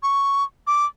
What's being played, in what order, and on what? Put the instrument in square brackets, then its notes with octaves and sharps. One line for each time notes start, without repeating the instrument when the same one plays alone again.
[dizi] C#6
D6